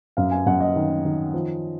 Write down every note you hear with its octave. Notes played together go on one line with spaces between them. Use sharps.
F#2 F5
G#5
F#2 F#5
D#5
D#3
D#3
F3